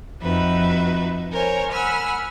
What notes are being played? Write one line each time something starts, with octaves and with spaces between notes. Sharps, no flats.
F2 D#4 F#4 B4 E5
A#4 C5 C#5 G#5
F#5 G#5 B5 E6 F6